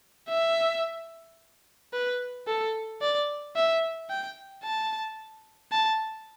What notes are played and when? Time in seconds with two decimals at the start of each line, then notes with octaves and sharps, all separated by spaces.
0.29 E5
1.93 B4
2.47 A4
3.01 D5
3.56 E5
4.10 G5
4.64 A5
5.72 A5